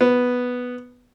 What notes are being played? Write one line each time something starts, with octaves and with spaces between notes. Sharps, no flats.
B3